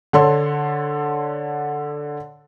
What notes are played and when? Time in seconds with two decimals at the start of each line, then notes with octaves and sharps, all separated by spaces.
0.13 D3 A4 C#5 C6